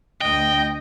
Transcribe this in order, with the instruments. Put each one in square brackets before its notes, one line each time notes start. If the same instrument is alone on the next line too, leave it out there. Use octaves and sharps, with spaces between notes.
[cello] D2 D#5 [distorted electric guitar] G5